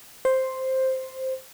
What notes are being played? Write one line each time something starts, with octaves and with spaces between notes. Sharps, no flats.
C5